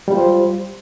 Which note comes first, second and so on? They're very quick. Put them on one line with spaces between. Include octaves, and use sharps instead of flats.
G3 F4 C5